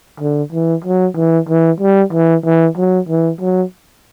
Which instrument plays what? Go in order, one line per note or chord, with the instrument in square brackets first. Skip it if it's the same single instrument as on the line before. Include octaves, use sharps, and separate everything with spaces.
[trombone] D3
E3
F#3
E3
E3
G3
E3
E3
F#3
E3
F#3